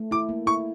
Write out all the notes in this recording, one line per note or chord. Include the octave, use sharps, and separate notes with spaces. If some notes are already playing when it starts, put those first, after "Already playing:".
Already playing: A3
E4 D6
A#3
E4 C#6